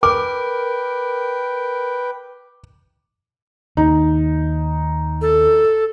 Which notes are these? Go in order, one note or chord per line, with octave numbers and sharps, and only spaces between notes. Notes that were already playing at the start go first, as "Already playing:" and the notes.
A#4 B4 G5 D6
D#2 D#4
A4